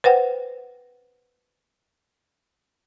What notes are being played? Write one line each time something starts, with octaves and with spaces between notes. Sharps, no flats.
B4 C5 F#5 G5